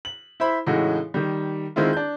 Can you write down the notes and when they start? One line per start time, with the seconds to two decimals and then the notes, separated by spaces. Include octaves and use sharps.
0.05 F#7
0.40 E4 C5 E5 B5
0.67 A2 C#3 E3 G#3 D#4 F#4
1.14 D#3 G3
1.76 D#3 G#3 C4 E4 F4
1.93 D4 G6